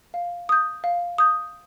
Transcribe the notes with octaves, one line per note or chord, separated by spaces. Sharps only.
F5
D#6 G6
F5
D#6 G6